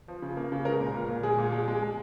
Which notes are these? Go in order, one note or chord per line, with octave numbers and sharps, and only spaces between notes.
F3
C#3
A#3
C#3
G#3 A#4
A#2
A#2
A#2
G#3 G#4
A#2
G#3
G#3
G#3